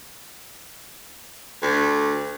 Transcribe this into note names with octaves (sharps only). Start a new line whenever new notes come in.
D2